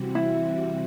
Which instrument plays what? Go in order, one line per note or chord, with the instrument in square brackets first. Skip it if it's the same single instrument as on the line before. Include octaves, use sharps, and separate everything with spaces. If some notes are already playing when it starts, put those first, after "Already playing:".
Already playing: [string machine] C3 E3 G3 C4 F#4
[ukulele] E4